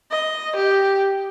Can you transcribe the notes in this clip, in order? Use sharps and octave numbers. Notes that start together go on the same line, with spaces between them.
D#5
G4